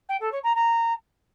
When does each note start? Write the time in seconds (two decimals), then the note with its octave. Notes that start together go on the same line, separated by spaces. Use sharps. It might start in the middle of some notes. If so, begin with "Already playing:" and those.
0.09 G5
0.20 A4
0.32 C#5
0.43 A#5
0.55 A#5